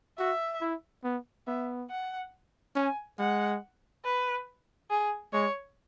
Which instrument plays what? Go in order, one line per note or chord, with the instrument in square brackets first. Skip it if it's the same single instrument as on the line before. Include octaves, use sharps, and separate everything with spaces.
[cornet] F#4 [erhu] E5
[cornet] E4
B3
[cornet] B3 [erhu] E5
[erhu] F#5
[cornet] C#4 [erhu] G#5
[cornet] G#3 [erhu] F#5
[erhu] B4
G#4
[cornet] G#3 [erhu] C#5